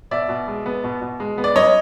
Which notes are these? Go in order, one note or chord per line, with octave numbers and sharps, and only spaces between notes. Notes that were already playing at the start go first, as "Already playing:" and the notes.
B2 D5 E5
B2
G#3
B3
B2
B2
G#3
B3
D5
F#2 C#5 D#5